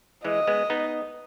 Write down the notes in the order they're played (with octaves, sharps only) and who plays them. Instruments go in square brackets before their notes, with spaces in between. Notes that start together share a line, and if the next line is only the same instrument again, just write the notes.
[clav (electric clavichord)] E3 G#3 [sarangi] D#5
[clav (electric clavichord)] G#3 B3
B3 D#4